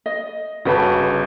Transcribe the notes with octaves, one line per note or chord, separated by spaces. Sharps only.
D#5
G1 C#3 F#4 B4 A5